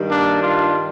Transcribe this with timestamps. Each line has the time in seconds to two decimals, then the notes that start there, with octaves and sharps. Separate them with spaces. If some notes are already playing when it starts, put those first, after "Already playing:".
Already playing: G2 D#3 G3
0.09 A#3 D4
0.41 D4 F4